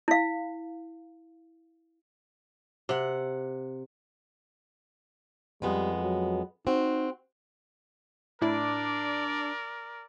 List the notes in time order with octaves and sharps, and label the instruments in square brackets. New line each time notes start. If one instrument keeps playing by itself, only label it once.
[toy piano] E4 F5
[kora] C3 F#5
[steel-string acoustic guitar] F2 G#3 B3 [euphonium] G3
[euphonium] F#3
[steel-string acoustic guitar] C4 F#4 [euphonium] D#4
[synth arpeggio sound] A2 E4 [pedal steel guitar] D4 [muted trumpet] A#4 [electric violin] D5